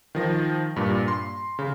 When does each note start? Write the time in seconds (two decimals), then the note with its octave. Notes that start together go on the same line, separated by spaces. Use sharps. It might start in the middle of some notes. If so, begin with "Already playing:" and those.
0.15 D#3 F3 A#6
0.76 G2 A#2
1.08 C6
1.59 C#3